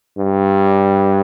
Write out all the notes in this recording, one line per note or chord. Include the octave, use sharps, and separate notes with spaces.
G2